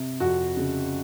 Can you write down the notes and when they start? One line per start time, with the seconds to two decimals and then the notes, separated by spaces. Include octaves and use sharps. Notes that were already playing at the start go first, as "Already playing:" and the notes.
Already playing: C3
0.20 F2 F#4
0.57 C#3